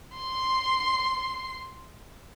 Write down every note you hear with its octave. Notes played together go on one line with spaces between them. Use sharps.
C6 C7